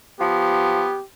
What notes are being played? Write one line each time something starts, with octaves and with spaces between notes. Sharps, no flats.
F3 B3 G4